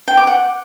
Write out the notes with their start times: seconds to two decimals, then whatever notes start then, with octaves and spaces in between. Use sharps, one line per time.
0.08 G5
0.17 D6
0.27 F#5